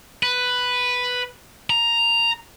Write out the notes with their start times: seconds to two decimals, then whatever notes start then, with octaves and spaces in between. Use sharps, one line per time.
0.23 B4
1.70 A#5